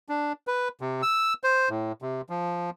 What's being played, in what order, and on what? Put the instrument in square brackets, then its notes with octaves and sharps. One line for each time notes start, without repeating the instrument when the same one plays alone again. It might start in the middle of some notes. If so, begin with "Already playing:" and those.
[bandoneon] D4
B4
C3
E6
C5
A2
C3
F3